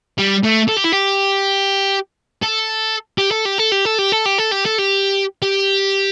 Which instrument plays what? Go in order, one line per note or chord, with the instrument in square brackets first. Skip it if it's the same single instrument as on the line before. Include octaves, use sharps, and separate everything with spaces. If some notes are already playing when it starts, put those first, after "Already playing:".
[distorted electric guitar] G3
A3
A4
G4
E4
G4
A4
G4
A4
G4
A4
G4
A4
G4
A4
G4
A4
G4
A4
G4
G4